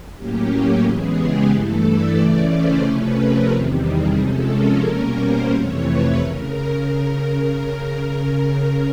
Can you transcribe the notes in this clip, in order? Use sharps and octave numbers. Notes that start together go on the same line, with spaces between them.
A2 F#3 A#3 C#4 G4
C#3 E3 G#3 B3 G#4
G4
G2 E3 A3 A4
D5
C#3 E3 A3 C#4
C5
C3 F3 A3 C#4 B4
A#4
E2 C3 D#3 G3
G#4
C3 F3 G#3 C#4 A4
A#4
B2 G3 A#3 C#4
C5
F2 C3 E3 A3 C#5
B4
C#3 A#4